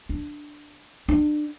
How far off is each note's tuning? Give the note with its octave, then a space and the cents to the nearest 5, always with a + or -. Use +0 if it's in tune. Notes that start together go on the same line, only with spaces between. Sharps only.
D4 +5
D4 +30